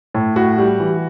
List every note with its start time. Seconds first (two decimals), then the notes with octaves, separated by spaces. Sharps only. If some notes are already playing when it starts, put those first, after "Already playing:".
0.14 A2
0.36 A2 F#4
0.58 G3
0.80 E3